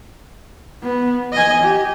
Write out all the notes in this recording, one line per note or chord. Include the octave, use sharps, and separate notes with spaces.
B3
D#5 G#5
G4